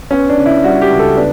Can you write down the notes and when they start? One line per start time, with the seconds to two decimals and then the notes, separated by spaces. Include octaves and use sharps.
0.11 B3 C#4
0.29 D4
0.38 C#3
0.46 E4
0.64 G3 F#4
0.82 G4
0.90 C#2
0.99 A4
1.17 B3 D4